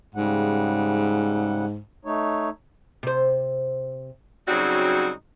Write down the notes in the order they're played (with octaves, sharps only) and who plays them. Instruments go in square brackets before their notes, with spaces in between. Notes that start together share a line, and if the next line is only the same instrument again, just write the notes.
[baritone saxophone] G#2 [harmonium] C#3 G3 F#5
[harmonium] A3 D#4 C#5
[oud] C3 C5
[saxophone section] C#3 F#3 G3 C4 D#4 F#4